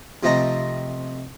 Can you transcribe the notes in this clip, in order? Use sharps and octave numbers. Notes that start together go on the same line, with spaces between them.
C3 F3 A3 C4 D#5 A#5